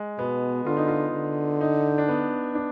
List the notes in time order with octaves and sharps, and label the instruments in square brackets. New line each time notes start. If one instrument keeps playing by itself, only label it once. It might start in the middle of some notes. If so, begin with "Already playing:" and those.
Already playing: [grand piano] G#3
[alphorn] B2 [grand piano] B3
[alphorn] D3 [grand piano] F4
[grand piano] D#4
F4
[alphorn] D3
[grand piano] D#4
D#4
D4
B3
D4